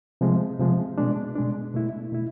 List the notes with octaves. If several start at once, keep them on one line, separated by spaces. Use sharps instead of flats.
C3 F3 G#3
C3 F3 G#3
B2 G#3 D4
B2 G#3 D4
B2 A3 E4
B2 A3 E4